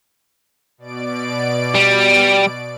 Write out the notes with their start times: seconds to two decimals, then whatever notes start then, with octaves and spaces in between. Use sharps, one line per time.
0.78 B2 D5 D7
1.75 G3